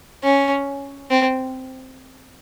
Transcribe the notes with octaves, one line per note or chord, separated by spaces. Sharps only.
C#4
C4